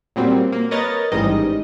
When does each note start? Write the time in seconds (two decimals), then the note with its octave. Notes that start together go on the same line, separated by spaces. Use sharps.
0.16 A#2 F#3 G3 C4
0.52 A#3
0.71 A#4 B4 C#5 D#5 A6
1.12 A1 G#2 D#3 G3 D#5